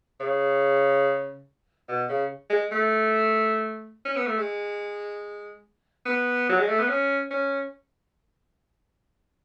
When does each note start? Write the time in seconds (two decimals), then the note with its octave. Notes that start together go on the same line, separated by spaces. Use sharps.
0.20 C#3
1.88 B2
2.09 C#3
2.50 G#3
2.71 A3
4.05 C#4
4.16 B3
4.26 A3
4.38 G#3
6.05 B3
6.49 F#3
6.59 G#3
6.68 A3
6.79 B3
6.89 C#4
7.31 C#4